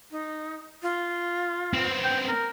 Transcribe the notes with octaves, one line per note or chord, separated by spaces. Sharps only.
D#4
F4
B3 C4
G5
A#4